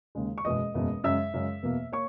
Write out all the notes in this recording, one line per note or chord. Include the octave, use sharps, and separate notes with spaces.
D#2 C#3 G#3
C#6
F#1 E2 B2 G#3 D#5 D#6
F#1 E2 B2 G#3
F#2 C#3 G#3 E5 E6
F#2 C#3 G#3
E2 B2 A#3
A#3 C#5 C#6